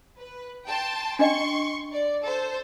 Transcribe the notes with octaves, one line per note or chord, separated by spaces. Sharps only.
B4
G5 A5 C6
D4 D#5 G5 C6 C#6
D5
A4 C5